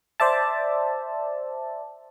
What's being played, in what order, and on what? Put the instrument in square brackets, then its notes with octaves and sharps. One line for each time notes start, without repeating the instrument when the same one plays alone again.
[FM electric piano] C5 D5 E5 A5